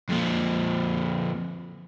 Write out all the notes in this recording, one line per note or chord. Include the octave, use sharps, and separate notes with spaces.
F2 A#2